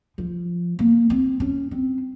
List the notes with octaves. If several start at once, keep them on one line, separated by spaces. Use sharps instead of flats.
F3
A#3
C4
C#4
C4